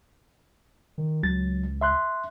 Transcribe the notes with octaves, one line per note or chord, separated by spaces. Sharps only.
D#3
C#2 F#3 A6
E5 C6 F#6